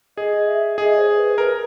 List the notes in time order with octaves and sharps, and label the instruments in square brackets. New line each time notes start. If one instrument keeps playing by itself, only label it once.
[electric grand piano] G#4 [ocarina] D#5
[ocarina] E5
[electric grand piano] G#4 [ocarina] D#5
[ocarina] C5
B4
[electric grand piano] A#4 [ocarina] B4